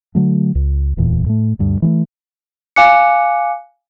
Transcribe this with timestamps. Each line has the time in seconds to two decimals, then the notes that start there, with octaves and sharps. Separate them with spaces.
0.15 D3 F#3 A3
0.55 C#2
0.97 D1 E2 A#2 E3
1.26 A2 A3
1.59 D2 G2
1.82 E3 G#3 A3
2.76 F5 G#5 D6 F#6 C#7